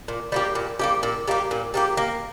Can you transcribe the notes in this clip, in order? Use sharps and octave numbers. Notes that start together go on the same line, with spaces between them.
A#2
G3 A#3 G4
A#2
G3 A#3 G4
A#2
G3 A#3 G4
A#2
G3 A#3 G4
A#3